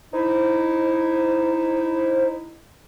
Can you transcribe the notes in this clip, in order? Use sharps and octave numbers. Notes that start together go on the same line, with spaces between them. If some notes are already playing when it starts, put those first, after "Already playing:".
D#4 E4 C5